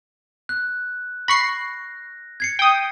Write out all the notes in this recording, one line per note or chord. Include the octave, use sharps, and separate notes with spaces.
F#6
B5 C#6 A#6 C7
G#6 C7 C#7
G5 D#6